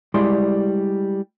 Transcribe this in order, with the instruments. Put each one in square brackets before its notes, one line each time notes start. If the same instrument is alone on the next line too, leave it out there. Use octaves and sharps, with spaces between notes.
[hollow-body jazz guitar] G3 G#3 E4 D5 C6